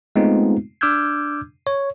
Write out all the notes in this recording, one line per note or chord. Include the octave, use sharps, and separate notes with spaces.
G#3 A3 B3 C4 D#4 F4
D4 D6 E6 F6 G6 G#6
C#5